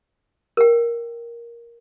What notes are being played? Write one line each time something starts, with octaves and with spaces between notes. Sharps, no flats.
A#4 G5